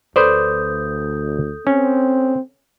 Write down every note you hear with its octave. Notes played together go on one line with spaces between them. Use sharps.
D2 A4 B4 C5 D5 D#6 G6
C4 C#4